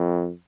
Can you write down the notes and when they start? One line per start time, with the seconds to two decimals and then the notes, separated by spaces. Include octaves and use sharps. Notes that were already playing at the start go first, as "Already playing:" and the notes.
Already playing: F2